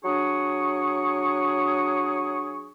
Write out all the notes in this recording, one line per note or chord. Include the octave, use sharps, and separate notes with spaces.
F#3 D4 G#4 C#6